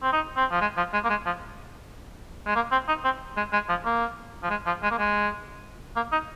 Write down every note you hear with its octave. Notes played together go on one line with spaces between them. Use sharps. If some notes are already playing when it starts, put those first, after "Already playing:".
C4
D#4
C4
F3
G#3
F3
G#3
A#3
G#3
F3
G#3
A#3
C4
D#4
C4
G#3
G#3
F3
A#3
F3
G#3
F3
G#3
A#3
G#3
A#3
D#4